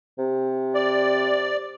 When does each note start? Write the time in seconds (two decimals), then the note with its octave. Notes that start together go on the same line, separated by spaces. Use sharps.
0.18 C3
0.75 D5